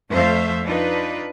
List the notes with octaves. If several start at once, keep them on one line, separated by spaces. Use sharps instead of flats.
F2 A3 C5 E5 F5
D4 D#4 F4 B4